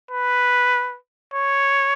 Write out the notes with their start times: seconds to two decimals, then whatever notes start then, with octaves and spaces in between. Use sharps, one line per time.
0.11 B4
1.34 C#5